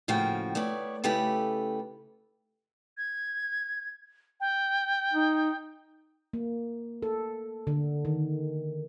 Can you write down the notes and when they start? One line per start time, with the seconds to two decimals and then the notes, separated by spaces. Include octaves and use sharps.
0.08 A2 C#3 F3 A#3 F#4 G5
0.55 A3 B3 C#5 D5
1.04 C#3 A3 E4 G4 A4 B4
2.98 G#6
4.40 G5
5.13 D#4
6.33 A#3
7.03 A4
7.67 D3
8.05 D#3